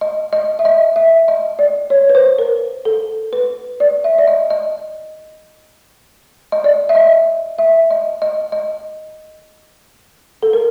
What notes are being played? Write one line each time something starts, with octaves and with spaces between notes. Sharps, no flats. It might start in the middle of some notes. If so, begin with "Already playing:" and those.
D#5
D#5
E5
D#5
E5
D#5
D5
C#5
B4
C5
A#4
A4
B4
D5
E5
D5
D#5
D#5
D#5
D5
E5
D#5
E5
D#5
D#5
D#5
A4
A#4